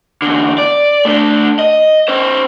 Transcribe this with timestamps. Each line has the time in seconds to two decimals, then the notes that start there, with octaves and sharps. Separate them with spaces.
0.22 E2 D3
0.58 D5
1.05 A3 D4
1.59 D#5
2.08 C#4 C5